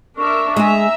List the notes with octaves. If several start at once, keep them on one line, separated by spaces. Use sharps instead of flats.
D4 A#4 E5 C#6
G#3 G#4 E5 A#5